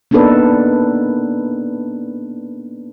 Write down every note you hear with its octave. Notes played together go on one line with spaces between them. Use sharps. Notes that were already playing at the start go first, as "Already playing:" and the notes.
A#3 B3 D4 D#4 A4 B4